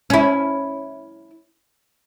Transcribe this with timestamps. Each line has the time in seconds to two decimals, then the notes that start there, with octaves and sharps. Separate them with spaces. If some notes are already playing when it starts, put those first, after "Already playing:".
0.10 C#4 E4